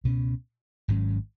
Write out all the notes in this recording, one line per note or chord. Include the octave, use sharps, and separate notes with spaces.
C#2 B2 G#3 C#4
G#1 G#2 F#3 C#4